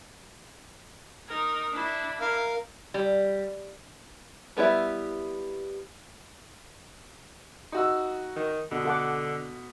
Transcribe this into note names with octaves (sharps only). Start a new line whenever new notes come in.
D#4 A#4
D4 E4
A#4 F5
G3
G3 B3 E4 B4 E5
D#4 F#4 E6
D#3
B2 D3
A4 F#5 D6